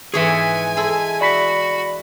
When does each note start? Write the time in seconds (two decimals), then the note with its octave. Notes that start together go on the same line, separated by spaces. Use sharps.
0.14 G#2 E3 G#4 C#5 E5 G#5
0.77 G#3 E4 A4
1.21 F#4 D5 B5 B6